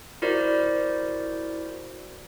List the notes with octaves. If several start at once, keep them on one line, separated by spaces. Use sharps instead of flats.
E4 F#4 A#4 C5 D5